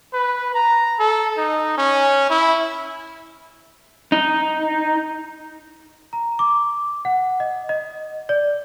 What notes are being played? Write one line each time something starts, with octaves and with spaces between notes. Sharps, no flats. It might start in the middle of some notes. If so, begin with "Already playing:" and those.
B4
A#5
A4
D#4
C#4
E4
D#4
A#5
D6
F#5
D#5
D#5
D5